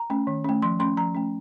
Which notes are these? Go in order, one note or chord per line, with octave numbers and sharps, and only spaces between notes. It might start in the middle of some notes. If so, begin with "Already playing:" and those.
Already playing: A#5
A3 C#4
D#3
A3 C#4
F3 C6
A3 C#4 C6
F3 A#5
A3 C#4